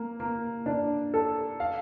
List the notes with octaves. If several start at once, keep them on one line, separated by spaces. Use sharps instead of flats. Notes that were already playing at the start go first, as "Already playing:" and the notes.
Already playing: A#3
A#3
D4
A4
F5